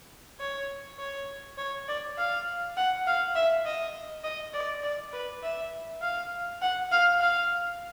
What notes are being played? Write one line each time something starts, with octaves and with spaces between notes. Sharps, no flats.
C#5
C#5
C#5
D5
F5
F#5
F5
E5
D#5
D#5
D5
D5
B4
E5
F5
F#5
F5
F5